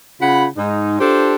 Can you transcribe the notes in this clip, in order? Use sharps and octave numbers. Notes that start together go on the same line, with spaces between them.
C#3 F4 F#5 B5
G#2 D#4
D4 F4 G4 A4 C5